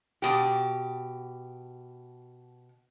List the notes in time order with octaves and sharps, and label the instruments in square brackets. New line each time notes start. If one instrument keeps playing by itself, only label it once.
[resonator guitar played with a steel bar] B2 G4